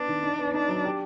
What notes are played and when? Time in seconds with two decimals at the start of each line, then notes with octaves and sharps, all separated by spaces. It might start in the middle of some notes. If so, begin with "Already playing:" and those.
Already playing: B3 D4
0.08 D#3
0.23 D#4
0.39 B3
0.54 D4 D#4
0.68 F#3
0.85 G4